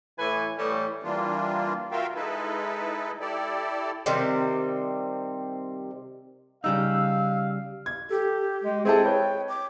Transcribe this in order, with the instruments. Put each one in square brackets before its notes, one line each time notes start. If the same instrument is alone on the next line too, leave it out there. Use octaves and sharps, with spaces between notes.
[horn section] A2 E3 E4 B4 G#5
A2 E3 G3
[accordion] E3 G3 A#3 D4 F4
F4 F#4 A#4 E5 F5 G5
G#3 D#4 E4 A4 B4
E4 G4 A4 D5
[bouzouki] C3 D#3 G3 C4
[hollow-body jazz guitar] C#3 G3 D#4 [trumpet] F5 [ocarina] E6
[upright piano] G#6
[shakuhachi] G4 [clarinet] A4
[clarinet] G#3
[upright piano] C4 E4 A4 [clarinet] G#4 [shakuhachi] G5
[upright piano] B4 D#5 G6 [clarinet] C#5
[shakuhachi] D6